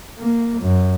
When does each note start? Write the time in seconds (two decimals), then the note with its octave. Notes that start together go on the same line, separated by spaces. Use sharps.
0.19 A#3
0.61 F#2